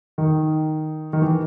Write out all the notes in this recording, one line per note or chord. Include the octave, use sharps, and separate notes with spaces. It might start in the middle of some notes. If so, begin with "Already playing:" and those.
D#3
D#3
E3